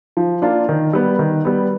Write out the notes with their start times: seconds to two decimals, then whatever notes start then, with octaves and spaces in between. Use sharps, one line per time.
0.17 F3
0.42 A#3 D4 F4
0.69 D#3
0.93 G3 B3
1.19 D#3
1.45 G3 B3